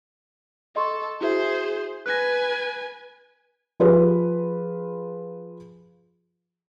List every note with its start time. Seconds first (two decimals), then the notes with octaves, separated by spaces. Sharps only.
0.76 A4 D#5 C6 C#6
1.21 E4 F#4 G#4 C5 E5
2.06 B4 G#5 F#6 A#6
3.80 F3 F4 G4 G#4 B4